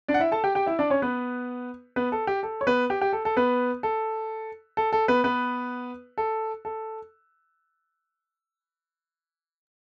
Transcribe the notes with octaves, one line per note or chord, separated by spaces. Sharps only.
D4 D5
F#5
E4 E5
A4 A5
G4 G5
G4 G5
E4 E5
D4 D5
C#4 C#5
B3 B4
B3 B4
A4
G4
A4
C#5
B3 B4
G4
G4
A4
A4
B3 B4
A4
A4
A4
B3 B4
B3 B4
A4
A4